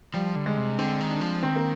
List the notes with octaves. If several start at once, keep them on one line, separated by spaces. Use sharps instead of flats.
F3 G3
D3
G#3
C3
D3 C4
D#3
D4
F3
D#3 C4
A#3